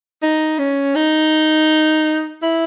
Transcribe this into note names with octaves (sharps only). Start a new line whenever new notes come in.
D#4
C#4
D#4
E4